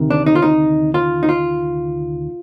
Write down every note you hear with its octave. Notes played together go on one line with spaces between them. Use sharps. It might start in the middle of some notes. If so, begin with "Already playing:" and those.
Already playing: D2 C3 D#3
D4
D#4
F4
D#4
F4
D#4
F4